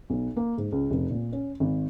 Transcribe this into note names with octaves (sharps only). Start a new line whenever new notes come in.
B1
A#3
G#2
C#2
F1
A#2
C#4
G#1